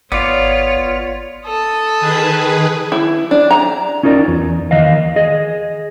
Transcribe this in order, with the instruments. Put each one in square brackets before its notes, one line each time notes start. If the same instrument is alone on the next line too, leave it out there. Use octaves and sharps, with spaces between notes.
[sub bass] G#1 [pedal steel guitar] B3 F4 [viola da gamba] C#5 [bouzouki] D5
[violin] A4 D#6
[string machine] D#3 G#4 B4
[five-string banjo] E4
D4
A#5
[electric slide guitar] C#4 D#4 F4 A#4 D5
E2
D#3 E3 D#5 F5
G#4 D#5